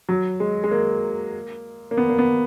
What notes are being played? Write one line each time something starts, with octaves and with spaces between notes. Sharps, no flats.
F#3
G#3
G#3
A#3
A#3
B3
A#3
B3